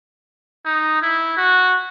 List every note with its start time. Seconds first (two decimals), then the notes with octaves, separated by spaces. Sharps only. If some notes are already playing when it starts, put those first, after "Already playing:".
0.65 D#4
1.02 E4
1.37 F#4